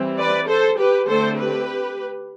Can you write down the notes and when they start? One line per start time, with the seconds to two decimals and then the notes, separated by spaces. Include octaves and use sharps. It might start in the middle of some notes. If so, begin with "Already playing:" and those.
Already playing: E3 G3 C4
0.17 B4 D5
0.47 A4 C5
0.78 G4 B4
1.08 D3 A3 C4 A4 C5
1.38 G4 B4